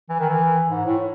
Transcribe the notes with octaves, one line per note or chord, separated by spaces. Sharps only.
E3
D#3
E3
G#2
A2